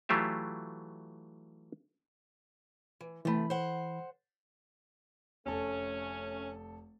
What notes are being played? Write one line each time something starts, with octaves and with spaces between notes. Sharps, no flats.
E3 F#3 A3 F4 G4 E5
E3
C3 E3 A3 B5
C5 F#5
F1 A3 C#4 A4